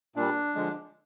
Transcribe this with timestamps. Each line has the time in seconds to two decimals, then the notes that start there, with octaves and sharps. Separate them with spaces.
0.16 A#2 G3 D4
0.55 D3 F3 G#3